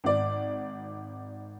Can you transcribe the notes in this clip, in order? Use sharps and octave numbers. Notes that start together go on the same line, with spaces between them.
G#1 D5